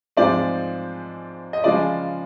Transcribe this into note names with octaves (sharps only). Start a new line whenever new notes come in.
G#2 F3 G#3 C4 D5
D#5
C#3 F3 G#3 D5